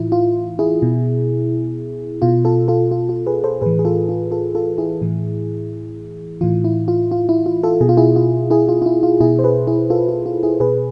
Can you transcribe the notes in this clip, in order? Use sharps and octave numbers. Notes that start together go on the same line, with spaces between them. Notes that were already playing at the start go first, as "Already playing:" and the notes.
Already playing: A2 E3 E4 F4
F4
E4 G#4
B2
B2 F4
F4 A4
F4 A4
F4
F4
G#4 B4
A4 C5
A2 E3 G#4 B4
G#4
F4 A4
F4
F4 A4
F4 A4
E4 G#4
A2 E3
A2 E3 F4
E4
F4
F4
E4
F4
F4 A4
B2 G#4
F4
E4 G#4
F4
E4 G#4
F4
F4
E4
F4
B2 E4 G#4
C5
G#4 B4
E4 G#4
F4 A4
F4
F4
E4 G#4
B2 G#4 B4